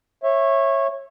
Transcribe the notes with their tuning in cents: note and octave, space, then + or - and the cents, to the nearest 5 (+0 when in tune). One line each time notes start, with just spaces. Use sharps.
C#5 -20 E5 +5